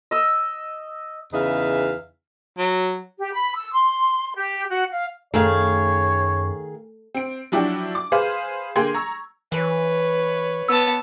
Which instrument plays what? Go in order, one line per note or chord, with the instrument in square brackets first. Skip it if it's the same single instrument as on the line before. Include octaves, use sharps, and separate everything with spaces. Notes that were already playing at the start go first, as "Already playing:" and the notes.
[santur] D#5 E6
[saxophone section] E2 C#3 D#4 B4 E5 F5
[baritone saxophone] F#3
[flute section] G4
B5
E6
C6
G4
F#4
F5
[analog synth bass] F#2 [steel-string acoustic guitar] D#3 G#4 F5 [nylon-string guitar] A3 [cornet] C#5
[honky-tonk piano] C4 D7
F3 F#3 D4 E4 F#4 G4
D6
G#4 B4 C5 F5
D3 A#3 G#4 G5 C6 G#6
A#5 C#6 E6
[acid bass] E3 [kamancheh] B4 C#5
[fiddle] B3 A5 [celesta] E6